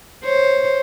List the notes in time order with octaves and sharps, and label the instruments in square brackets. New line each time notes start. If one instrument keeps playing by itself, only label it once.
[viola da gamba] C5 C#5